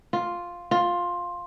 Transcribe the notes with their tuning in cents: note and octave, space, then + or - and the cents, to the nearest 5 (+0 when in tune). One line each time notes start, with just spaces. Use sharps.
F4 +5
F4 +10